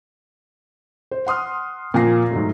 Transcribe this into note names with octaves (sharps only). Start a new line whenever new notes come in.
C5
F#5 C6 D#6 F6
A#2 F3 F4 G#5 A#6 C7
G#2 F#3 A3